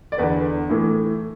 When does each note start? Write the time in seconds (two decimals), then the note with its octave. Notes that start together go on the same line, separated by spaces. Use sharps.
0.12 D5
0.18 E2 D3 B4
0.69 A2 E3